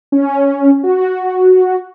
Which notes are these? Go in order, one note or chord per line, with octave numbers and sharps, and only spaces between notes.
C#4
F#4